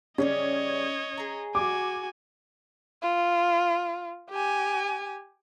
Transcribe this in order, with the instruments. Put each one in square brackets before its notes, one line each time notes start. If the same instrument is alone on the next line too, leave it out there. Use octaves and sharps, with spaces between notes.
[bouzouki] C#3 F#3 G3 [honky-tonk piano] C#4 [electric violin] C#5 D#5
[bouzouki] G#4 A#5
[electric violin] F#4 G#5 [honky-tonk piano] D6
[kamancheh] F4
G4 G#5